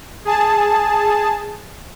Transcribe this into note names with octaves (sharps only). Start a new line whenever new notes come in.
G#4 A5